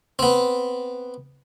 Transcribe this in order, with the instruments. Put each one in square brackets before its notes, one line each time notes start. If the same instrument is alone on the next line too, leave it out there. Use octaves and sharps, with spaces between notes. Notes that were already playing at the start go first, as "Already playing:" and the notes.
[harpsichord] B3 C4